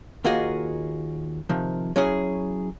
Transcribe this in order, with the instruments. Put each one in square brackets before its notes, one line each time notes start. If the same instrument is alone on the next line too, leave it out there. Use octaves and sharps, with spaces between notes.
[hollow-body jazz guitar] D#2 A#3 F4 F#4 G#4 D#5
C3 D#3 F3
F#3 C#4 E4 G#4